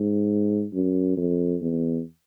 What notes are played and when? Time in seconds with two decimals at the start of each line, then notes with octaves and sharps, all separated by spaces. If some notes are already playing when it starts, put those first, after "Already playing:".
Already playing: G#2
0.74 F#2
1.17 F2
1.61 E2